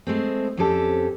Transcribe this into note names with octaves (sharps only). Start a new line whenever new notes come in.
G#3 A3 C4
F2 C4 C#4 G4 A4 G5